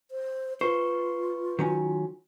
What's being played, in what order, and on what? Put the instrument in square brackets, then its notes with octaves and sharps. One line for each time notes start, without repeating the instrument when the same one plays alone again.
[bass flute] C5
[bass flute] F4 [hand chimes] B4 C#6 [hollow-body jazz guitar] C5
[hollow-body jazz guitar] D#3 F#3 C#4